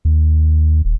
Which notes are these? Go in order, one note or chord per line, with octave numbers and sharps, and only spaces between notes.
D#2
D#1